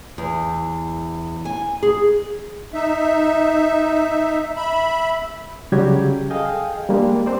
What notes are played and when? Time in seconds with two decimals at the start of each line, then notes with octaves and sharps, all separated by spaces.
0.18 E2
1.45 G#5
1.83 G#4
2.74 D#4 E5
4.57 E5 B5
5.72 C#3 F#3 G3 F#4 G4 G#6
6.30 G#4 A4 D#5 F5 G5 G#5
6.89 G3 G#3 A#3 D4 G4
7.26 C4 D4 C5 D5